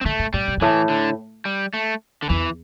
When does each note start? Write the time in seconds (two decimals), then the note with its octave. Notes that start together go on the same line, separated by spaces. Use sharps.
0.01 C4
0.05 D3 A3
0.19 A2
0.34 A2 G3
0.48 C3
0.57 G2
0.61 A2 E3
0.89 D3
1.45 G3
1.74 A3
2.23 D3
2.29 E2 E3